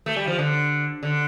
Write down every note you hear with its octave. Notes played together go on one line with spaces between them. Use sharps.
A3
G3
F3
D3
D3